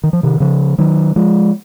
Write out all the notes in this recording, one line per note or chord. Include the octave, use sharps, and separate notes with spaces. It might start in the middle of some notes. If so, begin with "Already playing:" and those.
D#3
F3
C3 D#3
C#3 F3
D#3 F#3
F3 G#3